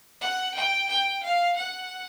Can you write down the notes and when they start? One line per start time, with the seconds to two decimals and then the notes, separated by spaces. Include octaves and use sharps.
0.21 F#5
0.54 G5
0.89 G5
1.23 F5
1.57 F#5